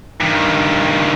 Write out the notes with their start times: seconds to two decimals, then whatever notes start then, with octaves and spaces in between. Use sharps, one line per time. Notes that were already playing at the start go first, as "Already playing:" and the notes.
0.21 G2 D#3